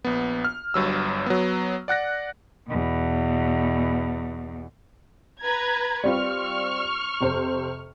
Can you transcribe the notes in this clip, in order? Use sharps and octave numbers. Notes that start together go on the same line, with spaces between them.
A#1 B3
F6
G1 G2 F#3 E6
F#3 B3
D5 F#5 F#6 A#6
E2 B2
B4 A#5 G#6
G3 C4 F4 C#6 F6
F2 C3 C5